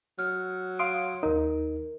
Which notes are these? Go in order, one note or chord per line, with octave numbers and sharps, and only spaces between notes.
F#3 F6
F5 C6 D#6 D7
D#2 D#4 A#4